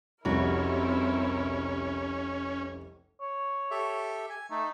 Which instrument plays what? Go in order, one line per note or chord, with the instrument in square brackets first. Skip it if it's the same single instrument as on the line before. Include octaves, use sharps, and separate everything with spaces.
[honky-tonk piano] F1 C2 [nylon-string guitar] G3 F#4 [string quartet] C4 E4 A#4 [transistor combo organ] C#4
[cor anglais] C#5
[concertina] G4 A4 E5
G#5
[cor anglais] A3 [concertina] D#4